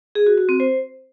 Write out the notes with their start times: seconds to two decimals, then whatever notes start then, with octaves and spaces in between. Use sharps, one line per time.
0.15 G#4
0.27 F#4
0.38 F#4
0.49 C4
0.60 C5